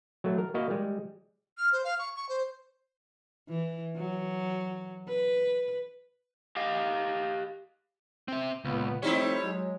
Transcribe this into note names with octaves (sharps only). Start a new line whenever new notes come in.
F#3 A3
A#4
A#3 E4 F#4 D#5 F5
G3 G#3
F6
C5
F5
C#6
C#6
C5
E3
F#3
B4
G4 D#5 F5
C4 E5
C#2 A#2 B3
F3 G3 A3 C4 D#4 E4 C#5
F#3 G#3